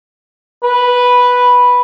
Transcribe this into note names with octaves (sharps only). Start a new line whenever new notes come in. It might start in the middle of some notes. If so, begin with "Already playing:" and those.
B4